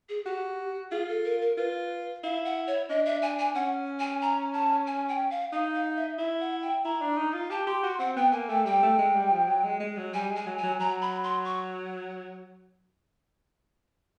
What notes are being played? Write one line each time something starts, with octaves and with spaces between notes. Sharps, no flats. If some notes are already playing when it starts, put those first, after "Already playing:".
G#4
F#4 G4
F4 G#4
A4
A#4
A#4
F4 B4
E4 F5
F#5
C#5
D4 D#5
E5
G#5
G#5
C#4 F#5
G#5
A#5
A5
G#5
G5
F5
D#4 F5
F5
E5
E4 E5
F#5
G5
E4 A#5
D4
D#4
F4
G4 A5
G4 C6
F#4 C6
C4 F#5
B3 G5
A#3 G#5
A3 G5
G3 G5
A3
G#3
G3
F3
F#3
G#3
G#3
F#3
G3 G#5
G#3
G#5
F#3
G#5
F#3
F#3 A#5
B5
C6
C#6